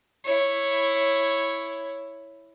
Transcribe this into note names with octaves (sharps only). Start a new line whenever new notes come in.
E4 C#5